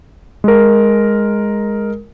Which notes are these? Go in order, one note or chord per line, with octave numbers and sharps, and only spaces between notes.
G#3 A#4